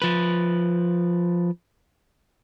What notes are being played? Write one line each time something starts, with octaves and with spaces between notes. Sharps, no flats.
F3 B4